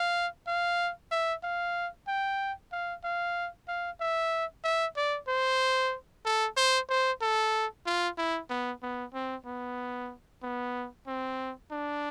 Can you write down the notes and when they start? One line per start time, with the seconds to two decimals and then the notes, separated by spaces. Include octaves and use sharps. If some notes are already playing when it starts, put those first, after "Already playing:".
Already playing: F5
0.47 F5
1.11 E5
1.43 F5
2.08 G5
2.72 F5
3.04 F5
3.68 F5
4.00 E5
4.64 E5
4.97 D5
5.28 C5
6.25 A4
6.57 C5
6.89 C5
7.22 A4
7.86 F4
8.17 E4
8.50 B3
8.83 B3
9.13 C4
9.46 B3
10.43 B3
11.07 C4
11.71 D4